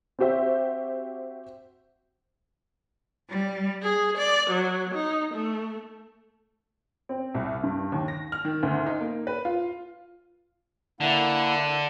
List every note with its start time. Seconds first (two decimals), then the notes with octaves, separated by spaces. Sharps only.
0.19 C4 F#4 G4 C5 E5
3.30 G3
3.82 G#4
4.16 D5
4.49 F#3
4.94 D#4
5.32 A3
7.09 C4
7.34 C2
7.63 G2
7.92 D#2
8.08 A#6
8.32 F6
8.45 D#3
8.63 D2
8.86 D#4
9.01 A#3
9.27 B4
9.45 F4
11.01 D3 A#3 E4 F#5